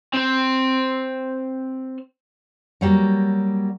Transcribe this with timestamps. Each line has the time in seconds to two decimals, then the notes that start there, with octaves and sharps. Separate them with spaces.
0.13 C4 C5
2.81 F#3 G3 A#3